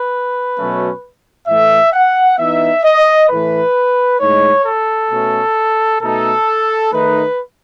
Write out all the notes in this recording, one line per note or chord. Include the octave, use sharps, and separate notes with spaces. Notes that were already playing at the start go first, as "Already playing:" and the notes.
Already playing: B4
B2 F#3 A3 C#4
A2 E3 A3 E5
F#5
E3 B3 D#4 E5
D#5
A2 E3 A3 B4
A2 G#3 D#4 C#5
A4
B2 A3 C#4
B2 A3 D#4 A4
D#3 A3 D#4 B4